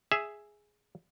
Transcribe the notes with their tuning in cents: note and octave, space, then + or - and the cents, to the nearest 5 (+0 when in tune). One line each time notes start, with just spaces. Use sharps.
G#4 +0 E5 +0